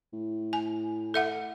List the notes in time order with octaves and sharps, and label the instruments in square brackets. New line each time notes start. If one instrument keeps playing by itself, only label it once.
[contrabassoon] A2
[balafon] G#5
A4 E5 F#5